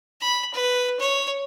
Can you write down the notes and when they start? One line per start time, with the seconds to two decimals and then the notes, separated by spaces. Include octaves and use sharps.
0.21 B5
0.54 B4
1.00 C#5